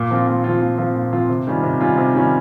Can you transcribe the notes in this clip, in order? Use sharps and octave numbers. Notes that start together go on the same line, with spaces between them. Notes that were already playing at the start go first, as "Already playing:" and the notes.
Already playing: A#2
F3 C4 F4
A#2
F3 C4 F4
A#2
F3 C4 F4
A#2
F3 C4 F4
C3
D#3 G3 C#4 F4
C3
D#3 G3 C#4 F4
C3
D#3 G3 C#4 F4